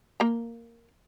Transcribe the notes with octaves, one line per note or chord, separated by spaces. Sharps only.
A#3 A#5